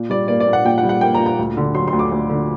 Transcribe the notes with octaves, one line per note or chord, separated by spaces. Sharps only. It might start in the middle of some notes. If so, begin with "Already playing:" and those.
Already playing: A#2
G3 D5
A#3 D5
D5
A#2
F#5
A#2 G5
F#5
G3
F#5
A#3 G5
A#5
A#2
A#5
D2
D3
F#3 C6
C6
D2
D6
D2
D3